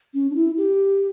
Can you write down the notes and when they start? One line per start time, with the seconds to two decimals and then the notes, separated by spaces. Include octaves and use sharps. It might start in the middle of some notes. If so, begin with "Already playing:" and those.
0.14 C#4
0.30 D4
0.35 E4
0.57 G4